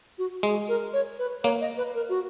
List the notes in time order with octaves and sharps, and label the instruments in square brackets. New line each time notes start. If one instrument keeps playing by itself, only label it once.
[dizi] F#4
[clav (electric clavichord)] G#3 [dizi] G#4
[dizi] A#4
C#5
B4
[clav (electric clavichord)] A#3 [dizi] C#5
[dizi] D#5
B4
A#4
F#4